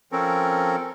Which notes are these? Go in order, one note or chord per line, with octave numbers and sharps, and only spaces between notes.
F3 C4 C#4 A4 A#4